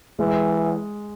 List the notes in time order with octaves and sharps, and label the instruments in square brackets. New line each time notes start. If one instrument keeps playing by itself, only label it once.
[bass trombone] E3 [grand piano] G#3